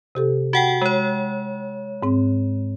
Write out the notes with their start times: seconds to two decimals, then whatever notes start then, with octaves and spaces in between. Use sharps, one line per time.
0.15 C3 G4 A4
0.53 F#4 F#5 G5
0.82 G#3 C#5
2.03 G#2 C4